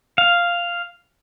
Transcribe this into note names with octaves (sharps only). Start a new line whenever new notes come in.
F5